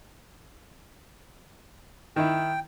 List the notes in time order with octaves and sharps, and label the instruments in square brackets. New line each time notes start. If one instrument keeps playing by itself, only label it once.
[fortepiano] D#3 E4 [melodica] G5